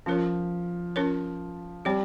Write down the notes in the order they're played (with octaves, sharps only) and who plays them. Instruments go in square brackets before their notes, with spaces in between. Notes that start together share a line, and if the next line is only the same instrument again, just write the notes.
[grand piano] F3 [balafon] C#4 F4 A#4 C#5
[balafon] C#4 F4 A#4 C#5
[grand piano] G3 [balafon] C4 G4 C#5